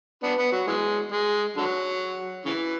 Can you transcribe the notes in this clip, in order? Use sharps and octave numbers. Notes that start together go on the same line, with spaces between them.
B3 D4
B3
F#3
E3 G#3
G#3
D3 F#3
C#3 E3